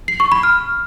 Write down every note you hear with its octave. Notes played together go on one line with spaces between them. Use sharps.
C7
C#6
B5
F6